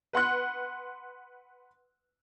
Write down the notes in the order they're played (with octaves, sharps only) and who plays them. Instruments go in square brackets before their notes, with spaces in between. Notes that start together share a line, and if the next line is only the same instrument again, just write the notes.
[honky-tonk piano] B4 F#5 C6 F#6